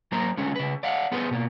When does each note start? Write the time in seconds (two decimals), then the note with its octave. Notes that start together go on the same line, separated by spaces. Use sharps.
0.12 F#3 A#3 A#4 C5 A#5
0.38 D3 G#3 C#4
0.56 C#3 B4
0.83 D5 F5 F#5
1.12 B3 G#4 B4 C5
1.31 B2 A#3